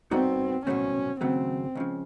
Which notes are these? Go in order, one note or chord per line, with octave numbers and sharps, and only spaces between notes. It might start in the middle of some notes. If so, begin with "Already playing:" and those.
G3 B3 C4 D#4 F#4 A4
C2 B2 F#3 A3 C4 C#4
D#2 C#3 F#3 A3 C4
C#2 C#3 F3